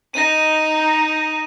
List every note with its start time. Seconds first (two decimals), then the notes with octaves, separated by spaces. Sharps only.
0.14 D#4 A#6 D#7